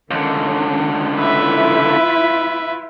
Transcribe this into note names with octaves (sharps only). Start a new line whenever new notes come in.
C#2 D3 D#3 C#4
E4 F4 B4 E5